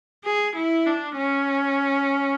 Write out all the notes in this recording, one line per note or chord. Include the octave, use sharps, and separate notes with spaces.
G#4
E4
D4
C#4